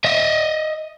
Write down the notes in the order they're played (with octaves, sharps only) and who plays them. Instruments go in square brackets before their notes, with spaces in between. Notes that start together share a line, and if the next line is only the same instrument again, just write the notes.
[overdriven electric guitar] D#5 E5